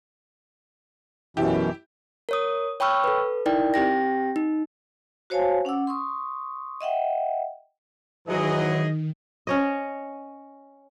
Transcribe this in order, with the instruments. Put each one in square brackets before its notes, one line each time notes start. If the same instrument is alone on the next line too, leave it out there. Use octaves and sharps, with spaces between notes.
[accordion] F#2 B2 E3 [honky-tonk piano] E4 G4
[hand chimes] A#4 C#5 D#6
C#5 G5 B5 C#6 E6 F6
A4 B4
D#4 E4 A#4 D5 G5
C4 G4 G5 A#6
D#4
[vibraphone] F#4 C5 C#5 F5 G#5 A5
C#4 F#5 D6 E6
C6 C#6 D#6
D#5 E5 F#5 G5
[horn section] G#2 E3 F#3 [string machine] D#3 [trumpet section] G#4 D#5
[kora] C#4 C#5 D#5